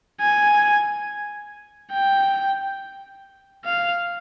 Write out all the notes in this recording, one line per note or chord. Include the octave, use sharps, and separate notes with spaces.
G#5
G5
F5